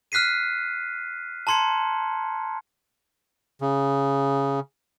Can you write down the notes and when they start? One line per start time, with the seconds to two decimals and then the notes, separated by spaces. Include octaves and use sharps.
0.12 F6 F#6 B6 C7 D#7
1.47 A5 A#5 C6 G#6 C#7
3.61 C#3